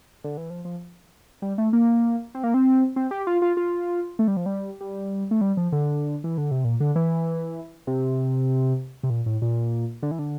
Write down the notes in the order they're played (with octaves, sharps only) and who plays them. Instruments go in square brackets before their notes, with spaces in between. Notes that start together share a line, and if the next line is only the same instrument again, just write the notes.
[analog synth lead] D3
E3
F3
F3
G3
A3
A#3
C4
A#3
C4
C4
G4
F4
F4
F4
A3
G3
F3
G3
G3
A3
G3
F3
D3
E3
D3
C3
A#2
D3
E3
C3
C3
A#2
A2
A#2
D3
E3
D3